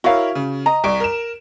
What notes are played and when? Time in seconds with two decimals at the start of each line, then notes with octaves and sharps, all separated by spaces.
0.04 E4 F#4 A#4 C#5 F5
0.35 C#3
0.66 D#5 A#5
0.84 C2 C#6 D7
1.00 A#4 E7